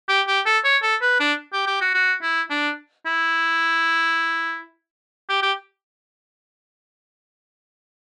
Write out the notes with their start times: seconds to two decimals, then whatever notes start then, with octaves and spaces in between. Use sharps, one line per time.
0.09 G4
0.27 G4
0.46 A4
0.64 C#5
0.83 A4
1.02 B4
1.20 D4
1.53 G4
1.67 G4
1.81 F#4
1.94 F#4
2.22 E4
2.50 D4
3.06 E4
5.29 G4
5.43 G4